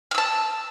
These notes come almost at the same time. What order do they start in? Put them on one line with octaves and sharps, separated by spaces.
F6 E6 A5